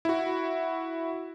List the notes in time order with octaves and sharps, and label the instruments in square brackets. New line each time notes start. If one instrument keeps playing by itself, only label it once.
[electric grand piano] E4 F#4